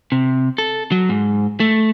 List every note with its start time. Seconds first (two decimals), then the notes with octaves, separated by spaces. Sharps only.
0.12 C3
0.58 A4
0.92 F#3
1.09 G#2
1.60 A3